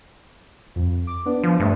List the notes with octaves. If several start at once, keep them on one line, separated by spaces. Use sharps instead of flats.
F2
D6
B3 D4
F3
G2 A3 E5